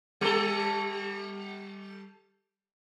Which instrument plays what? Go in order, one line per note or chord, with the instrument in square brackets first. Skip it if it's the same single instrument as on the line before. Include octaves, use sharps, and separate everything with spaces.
[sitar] G3 A4